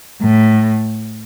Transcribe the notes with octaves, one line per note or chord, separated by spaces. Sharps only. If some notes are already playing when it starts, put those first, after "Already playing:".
A2